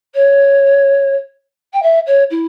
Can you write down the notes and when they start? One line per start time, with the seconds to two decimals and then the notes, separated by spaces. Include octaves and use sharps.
0.14 C#5
1.73 G5
1.82 E5
2.06 C#5
2.30 E4